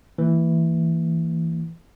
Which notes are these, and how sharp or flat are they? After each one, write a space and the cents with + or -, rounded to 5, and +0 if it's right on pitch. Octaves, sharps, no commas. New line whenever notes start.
E3 +0 A#3 -30